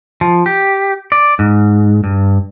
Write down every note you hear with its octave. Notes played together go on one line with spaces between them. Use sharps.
F3
G4
D5
G#2
G2